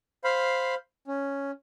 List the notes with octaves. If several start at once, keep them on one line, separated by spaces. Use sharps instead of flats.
C5 F5 B5
C#4